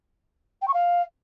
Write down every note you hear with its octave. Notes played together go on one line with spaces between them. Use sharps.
G5
C#6
F5